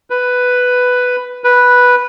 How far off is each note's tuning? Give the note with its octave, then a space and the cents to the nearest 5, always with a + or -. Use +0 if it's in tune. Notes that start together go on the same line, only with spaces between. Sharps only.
B4 +5
B4 -5